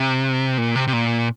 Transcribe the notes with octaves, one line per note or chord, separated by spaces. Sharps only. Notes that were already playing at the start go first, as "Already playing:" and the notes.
Already playing: C3
A#2
C3
C3
A#2